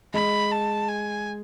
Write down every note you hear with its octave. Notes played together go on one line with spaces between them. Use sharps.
G#3 B5
A5
G#5